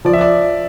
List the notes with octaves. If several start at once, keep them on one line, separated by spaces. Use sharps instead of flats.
F3 D5
E5
D5